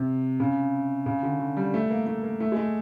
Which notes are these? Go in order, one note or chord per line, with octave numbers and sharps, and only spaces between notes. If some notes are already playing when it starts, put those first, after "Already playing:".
Already playing: C3
C#3
C#3
D3
D3
G3
A3
A#3
A3
A#3
A3
G#3
A3